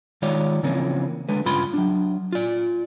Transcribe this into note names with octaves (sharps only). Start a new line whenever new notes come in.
D#3 G#3 F4 C#5 D5
C#3 E3 F3 A#3 C4 C#4
D3 G#3 B4
G2 C#3 F4 B5 C6
F#3 D4
F4 D5